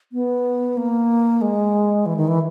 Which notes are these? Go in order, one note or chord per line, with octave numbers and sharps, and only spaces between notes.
B3
A#3
G#3
E3
D#3
E3